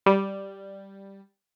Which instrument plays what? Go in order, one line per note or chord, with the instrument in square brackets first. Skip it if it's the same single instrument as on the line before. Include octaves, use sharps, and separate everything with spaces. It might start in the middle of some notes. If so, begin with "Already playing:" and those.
[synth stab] G3